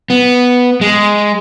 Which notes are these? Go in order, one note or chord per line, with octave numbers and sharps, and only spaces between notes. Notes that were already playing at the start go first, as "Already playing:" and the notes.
B3
G#3